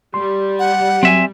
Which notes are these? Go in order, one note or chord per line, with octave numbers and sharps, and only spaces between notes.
G3 C6
F#5
F#3 C4 E5 G#5